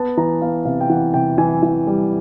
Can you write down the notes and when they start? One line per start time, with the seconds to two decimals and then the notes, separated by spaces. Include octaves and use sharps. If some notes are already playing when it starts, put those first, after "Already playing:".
Already playing: B3 A5
0.17 E3 A#5
0.42 B3 F5
0.65 C3 F5
0.81 G5
0.89 E3 F#5
1.14 C3 G5
1.38 E3 G#5
1.63 E3
1.87 G3